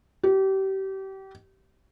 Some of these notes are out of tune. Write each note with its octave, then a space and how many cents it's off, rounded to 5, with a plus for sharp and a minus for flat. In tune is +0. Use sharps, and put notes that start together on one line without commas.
G4 -30